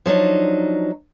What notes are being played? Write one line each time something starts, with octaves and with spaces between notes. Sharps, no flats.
F3 F#3 D4 D#4